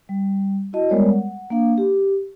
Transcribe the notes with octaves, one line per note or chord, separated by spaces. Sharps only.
G3
E4 F#4 D#5 A5
G3 G#3 B3 A#4 C#5 D5
F#5
A#3 D4 F5
G4